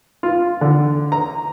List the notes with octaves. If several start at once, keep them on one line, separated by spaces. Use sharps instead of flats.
F4
D3
A#5